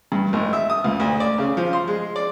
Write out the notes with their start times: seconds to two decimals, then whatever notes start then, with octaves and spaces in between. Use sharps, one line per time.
0.12 G2
0.33 G#1
0.53 E5
0.70 D#6
0.84 C#2
1.00 D2
1.20 D5
1.38 C#3
1.57 F3
1.73 C6
1.88 G#3
2.16 D5